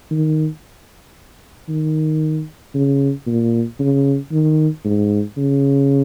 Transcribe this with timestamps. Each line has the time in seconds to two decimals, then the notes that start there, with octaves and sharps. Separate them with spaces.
0.11 D#3
1.69 D#3
2.74 C#3
3.27 A#2
3.79 C#3
4.31 D#3
4.85 G#2
5.37 C#3